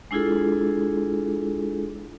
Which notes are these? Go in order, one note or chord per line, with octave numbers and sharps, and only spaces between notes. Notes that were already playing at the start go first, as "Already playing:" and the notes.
G#3 D4 E4 F4 G#4 A4